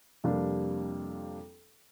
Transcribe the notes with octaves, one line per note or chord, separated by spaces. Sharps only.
F2 C3 G3 A#3 D4